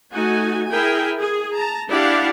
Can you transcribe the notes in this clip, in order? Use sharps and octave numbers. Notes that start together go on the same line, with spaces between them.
A3 D#4 F#4 G#5
E4 G#4 A#4 G5 G#5
G#4
A5 A#5
D4 E4 G4 D5 F5 F#5